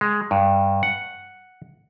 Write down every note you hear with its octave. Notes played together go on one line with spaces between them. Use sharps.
G#3
G2
F#5